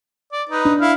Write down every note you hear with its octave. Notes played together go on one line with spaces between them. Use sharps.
D5
D#4 B4
D4
E4 F5 F6